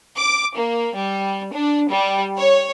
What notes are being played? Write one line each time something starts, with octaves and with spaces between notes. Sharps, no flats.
D6
A#3
G3
D4
G3
C#5